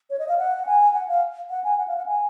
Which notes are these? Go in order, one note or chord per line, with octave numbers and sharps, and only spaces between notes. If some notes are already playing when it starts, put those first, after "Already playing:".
C#5
D#5
F5
F#5
G#5
F#5
F5
F#5
G#5
F#5
F5
F#5
G#5